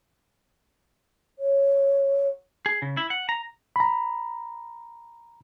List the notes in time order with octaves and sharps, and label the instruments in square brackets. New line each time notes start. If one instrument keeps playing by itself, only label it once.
[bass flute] C#5
[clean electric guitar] G#4
C#3
E4
F#5
A#5
[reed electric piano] A#5 B5